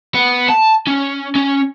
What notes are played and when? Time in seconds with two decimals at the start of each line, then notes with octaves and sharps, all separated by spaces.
0.15 B3
0.50 A5
0.87 C#4
1.36 C#4